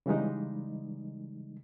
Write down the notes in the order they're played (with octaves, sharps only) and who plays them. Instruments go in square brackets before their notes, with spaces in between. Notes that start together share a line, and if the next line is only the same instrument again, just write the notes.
[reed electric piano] C#3 E3 G3 G#3 D#4